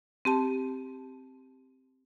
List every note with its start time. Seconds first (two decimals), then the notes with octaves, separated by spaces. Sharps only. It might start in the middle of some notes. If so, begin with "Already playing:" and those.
0.25 C4 G4 A5